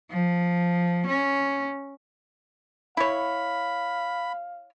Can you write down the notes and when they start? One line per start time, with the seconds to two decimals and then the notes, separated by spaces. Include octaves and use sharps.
0.11 F3
1.07 C#4
2.97 E4 C#5 F5 B5